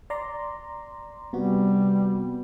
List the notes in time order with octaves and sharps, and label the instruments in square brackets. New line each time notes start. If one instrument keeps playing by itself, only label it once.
[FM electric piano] D5 A#5 C6
[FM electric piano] C3 B3 F#4 [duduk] G3